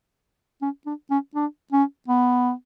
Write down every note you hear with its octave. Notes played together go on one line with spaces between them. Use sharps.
C#4
D4
C#4
D4
C#4
B3